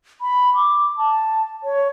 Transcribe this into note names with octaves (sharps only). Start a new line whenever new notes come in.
B5
D6
A5
C#5